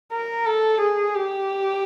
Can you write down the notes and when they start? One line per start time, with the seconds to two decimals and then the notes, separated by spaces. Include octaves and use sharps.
0.12 A#4
0.46 A4
0.81 G#4
1.15 G4